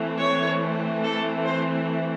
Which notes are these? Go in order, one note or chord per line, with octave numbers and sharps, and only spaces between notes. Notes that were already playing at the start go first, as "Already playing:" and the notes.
Already playing: E3 A3 C4
C#5
A4
C5